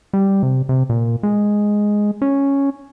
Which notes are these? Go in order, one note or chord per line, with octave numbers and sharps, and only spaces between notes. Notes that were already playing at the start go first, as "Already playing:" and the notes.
G3
C3
C3
A#2
G#3
C#4